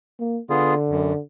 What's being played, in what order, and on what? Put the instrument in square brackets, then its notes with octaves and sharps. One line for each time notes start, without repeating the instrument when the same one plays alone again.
[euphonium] A#3
[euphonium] D3 [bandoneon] B3 F4 G#4
[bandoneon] F#2